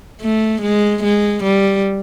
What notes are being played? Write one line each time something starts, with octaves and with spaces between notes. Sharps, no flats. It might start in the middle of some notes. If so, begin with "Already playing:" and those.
A3
G#3
G#3
G3